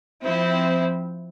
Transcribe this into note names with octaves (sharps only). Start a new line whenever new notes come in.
F3 C4 E4